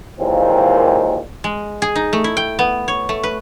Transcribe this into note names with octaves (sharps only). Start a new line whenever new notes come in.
D#2 A#2 E3 G#3 A#3 C4
G#3
G#4
D#4
A3
E4
G5
B3
C#5
A3
B4